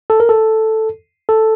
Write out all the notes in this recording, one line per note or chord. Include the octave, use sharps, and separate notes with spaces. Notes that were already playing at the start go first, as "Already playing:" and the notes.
A4
A#4
A4
A4